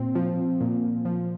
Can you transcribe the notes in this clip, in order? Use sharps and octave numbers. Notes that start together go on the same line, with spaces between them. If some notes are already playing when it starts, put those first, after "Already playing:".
Already playing: A#2 C4
F3
A#2
F3